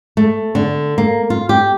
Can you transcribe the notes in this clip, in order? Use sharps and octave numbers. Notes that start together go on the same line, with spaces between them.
A3
D3
A#3
F4
G4